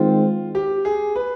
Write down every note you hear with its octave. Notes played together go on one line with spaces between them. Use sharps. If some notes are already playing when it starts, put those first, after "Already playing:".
Already playing: D#3 G#3 C4 F4
G4
G#4
B4